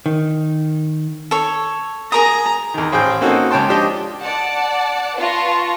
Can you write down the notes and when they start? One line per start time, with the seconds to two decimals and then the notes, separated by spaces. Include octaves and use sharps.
0.06 D#3
1.31 A4 C#5
2.12 G#4 A#4 A#5 D#6
2.74 E2 D#3
2.92 A1 G#4 C5 G5
3.21 A#3 C4 C#4 D#4 F#4 A4
3.51 C#2 C#5 G5 A5 C6
3.68 F3 D4 G4 D#5
4.22 D5 F#5 A5
5.18 F4 B4 A5 C#6 A#6